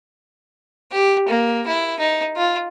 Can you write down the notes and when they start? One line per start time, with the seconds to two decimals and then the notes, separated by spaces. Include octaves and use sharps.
0.92 G4
1.28 A#3
1.67 E4
1.99 D#4
2.37 F4